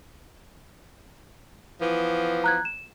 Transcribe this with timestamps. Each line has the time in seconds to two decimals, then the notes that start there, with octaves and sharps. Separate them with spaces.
1.81 E3 F3 B3
2.44 A#5 F#6 G#6
2.65 E7